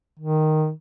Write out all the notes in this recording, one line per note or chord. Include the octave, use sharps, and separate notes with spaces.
D#3